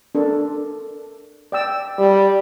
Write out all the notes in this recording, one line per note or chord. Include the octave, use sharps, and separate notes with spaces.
D4 A4 A#4
D5 G5 E6
G3